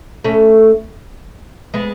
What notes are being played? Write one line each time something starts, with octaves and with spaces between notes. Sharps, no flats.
A3 C#4
G#3 B3